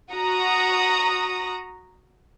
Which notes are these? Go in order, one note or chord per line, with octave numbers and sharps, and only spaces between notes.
F#4 A#5 D#6